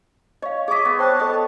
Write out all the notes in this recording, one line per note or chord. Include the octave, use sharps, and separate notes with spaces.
C#5 D#5 F5
G#4 C#5 D#5 D6 B6
B3
C5 G5 A5 F#6
A4 C#5 D#5 D#6